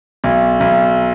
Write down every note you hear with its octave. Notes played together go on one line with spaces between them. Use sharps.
B1
B1